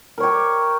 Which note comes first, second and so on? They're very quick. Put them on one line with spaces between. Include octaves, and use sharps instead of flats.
A#4 C#5 G4